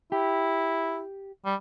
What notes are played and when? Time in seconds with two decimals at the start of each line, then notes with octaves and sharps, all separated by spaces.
0.12 E4 G4
1.45 G3